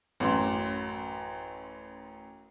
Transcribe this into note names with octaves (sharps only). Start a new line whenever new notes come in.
A1 F#2 C6